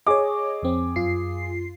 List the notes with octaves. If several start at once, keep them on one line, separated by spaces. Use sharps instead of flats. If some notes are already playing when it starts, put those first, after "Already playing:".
G#4 C#5 D#5 D6
F2 C4
F#2 F4 C7